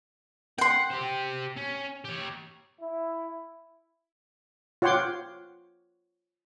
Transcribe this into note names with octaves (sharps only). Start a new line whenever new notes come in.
F#5 G5 C6
G4 C5
C#4
G4 C#5
E4
F4 C#5 F#5 G5 C6 D6